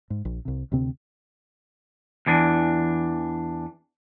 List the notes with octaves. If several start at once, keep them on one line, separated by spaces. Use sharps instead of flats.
G#2
A#1
C2 C3
D2 C3 C4
E2 E3 D4